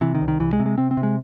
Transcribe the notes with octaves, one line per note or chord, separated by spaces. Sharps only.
C3 E3
D#3
C2
D#3
C2 E3
G#3
C3
G#3
C3 C4
C4
C3
G#3